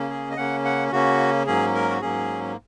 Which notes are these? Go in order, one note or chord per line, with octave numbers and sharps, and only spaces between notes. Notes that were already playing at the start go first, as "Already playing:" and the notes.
Already playing: C#3 A#3 C#4
G#4
D#5
C#3 A#3 C#4 F#5
F#5
C#3 A#3 C#4 F#4
G#2 F#3 A#3 C#4 G#4
A#4
F#4
G#2 F#3 A#3 C#4 G#4